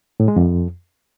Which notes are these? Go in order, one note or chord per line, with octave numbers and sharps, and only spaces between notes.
A2
G#3
F2